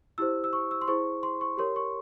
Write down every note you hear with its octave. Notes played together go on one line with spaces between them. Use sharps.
E4 G4 C5 E6
E6
C#6
E6
C6
E4 G#4 C5 C#6
C6
C#6
G4 A#4 C#5 C6
C#6